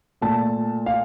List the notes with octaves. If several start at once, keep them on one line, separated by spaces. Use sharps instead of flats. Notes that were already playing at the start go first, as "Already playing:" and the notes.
A#2 A3 A5
F5